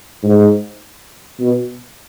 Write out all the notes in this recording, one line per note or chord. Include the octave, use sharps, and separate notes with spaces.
G#2
B2